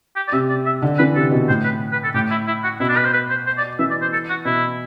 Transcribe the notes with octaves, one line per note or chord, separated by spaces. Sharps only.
G4
D5
C3 E5
D5
E5
D3
E3 B4
C3 A4
B2
A2 C5
B4
B4
A4
A2 G4
E4
E4
F#4
B2 E4
D4
B4
C5
B4
C5
C5
D5
E3 E5
D5
C5
A4
F#4
B2 E4